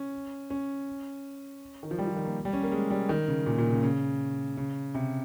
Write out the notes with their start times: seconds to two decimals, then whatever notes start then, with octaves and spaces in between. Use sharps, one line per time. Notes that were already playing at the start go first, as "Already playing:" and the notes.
Already playing: C#4
0.50 C#4
1.83 D#3
1.91 F3
1.98 G3
2.07 F3
2.16 D#3
2.26 A#3
2.45 G3
2.53 C#4
2.63 A#3
2.72 G#3
2.91 G3
3.09 D#3
3.28 C#3
3.46 A#2
3.58 A#2
3.71 C#3
3.83 C#3
4.57 C#3
4.95 C3